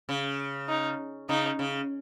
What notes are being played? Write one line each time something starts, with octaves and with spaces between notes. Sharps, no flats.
C#3
D#4
C#3 D#4
C#3